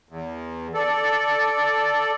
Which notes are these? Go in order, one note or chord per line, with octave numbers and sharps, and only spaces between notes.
E2
A4 D5